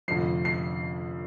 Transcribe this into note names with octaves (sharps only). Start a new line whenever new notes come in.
F1 F2 D3 F3 C7
C7